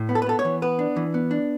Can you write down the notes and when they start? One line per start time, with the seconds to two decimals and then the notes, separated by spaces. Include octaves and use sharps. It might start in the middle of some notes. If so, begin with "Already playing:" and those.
Already playing: A2
0.09 B3
0.15 A4
0.22 B4
0.27 B3 A4
0.39 C#5
0.45 E3
0.62 B3 B4
0.79 D4
0.97 E3
1.14 B3
1.31 D4